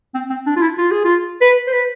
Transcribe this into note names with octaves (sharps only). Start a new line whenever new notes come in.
C4
C4
D4
F4
E4
F4
G#4
F4
B4
C5
B4